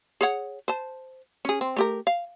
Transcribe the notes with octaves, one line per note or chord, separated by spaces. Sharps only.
G#4 C#5 F#5
C5 A5
C#4 G#4
C4
A3 G4 A#4
F5